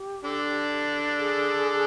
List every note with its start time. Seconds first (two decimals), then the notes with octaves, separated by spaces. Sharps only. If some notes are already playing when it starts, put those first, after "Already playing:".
Already playing: G4
0.24 D3 D4
1.18 G#4